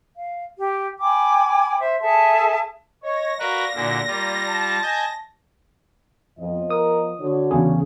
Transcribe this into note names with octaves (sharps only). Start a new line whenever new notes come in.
F5
G4
G5 G#5 B5 D6
C5 E5
G#4 A4 E5 A5
C#5 D#5 A#6
F#4 A#4 B4 D5 F5
A#2 D3 E4 F#4 G#4
G3 A#3 F4
A5
D#5 G#5 G6
F2 F3 B3 D#5
A#4 D#6
D3 F#4 C#5
E2 C#3 G#4